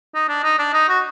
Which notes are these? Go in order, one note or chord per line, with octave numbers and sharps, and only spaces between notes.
D#4
D4
D#4
D4
D#4
F#4